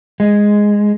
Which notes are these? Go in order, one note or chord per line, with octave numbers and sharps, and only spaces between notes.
G#3